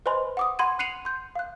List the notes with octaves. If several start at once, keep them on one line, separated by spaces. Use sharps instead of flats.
B4 C5 D#5 G#5 B5 C6
F#5 D6 D#6
F#5 B5 C6 G#6 D#7
F#6 C7 C#7 D#7 F7 F#7
C6 G6
F5 F#6